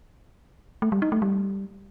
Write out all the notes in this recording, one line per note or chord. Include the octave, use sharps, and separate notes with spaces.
A3
G3
D#4
A3
G3